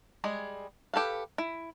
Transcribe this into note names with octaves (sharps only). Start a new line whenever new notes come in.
G3 G#3 G#4
G4 A4 B4 F5
E4